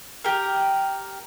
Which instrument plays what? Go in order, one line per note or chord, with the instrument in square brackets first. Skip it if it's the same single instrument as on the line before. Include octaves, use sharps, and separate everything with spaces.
[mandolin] G4 A#4